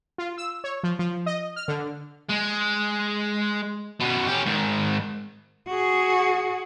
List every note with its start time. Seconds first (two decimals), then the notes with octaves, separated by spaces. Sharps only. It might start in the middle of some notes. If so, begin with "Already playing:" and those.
0.18 F4
0.38 E6
0.64 C#5
0.84 F3
0.99 F3
1.26 D#5
1.56 F6
1.68 D3
2.30 G#3
4.00 B2 C#4
4.27 C#4 G4
4.46 G#2 D#3
5.67 F#4 G#4